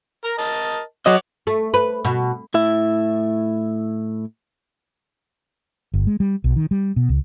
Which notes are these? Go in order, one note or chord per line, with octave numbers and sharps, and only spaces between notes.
A#4 A#5
A#4 D#5 A5
F#3 C#5 D#5 F#5 D6
A3
B4
B2
A2 E4 E5
G1
G#3
G3
B1
D#3
G3
B2
C#2